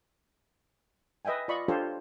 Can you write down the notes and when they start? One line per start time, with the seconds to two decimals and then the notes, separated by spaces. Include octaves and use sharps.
1.25 B4 D#5 E5 G5 G#5
1.48 F4 D5 D#5 B5 C#6
1.68 D4 F4 G4 A4 C5 C#5